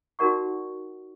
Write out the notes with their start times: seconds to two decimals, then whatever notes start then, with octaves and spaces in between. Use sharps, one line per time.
0.19 D#4 F#4 A#4 D5 F#5 C#6